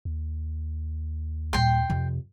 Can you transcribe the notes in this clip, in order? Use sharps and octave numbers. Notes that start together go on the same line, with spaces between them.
D#2
A#2 G3 G5 C6
F2 C3